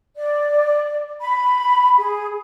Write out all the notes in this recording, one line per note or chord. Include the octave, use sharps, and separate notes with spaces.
D5
B5
G#4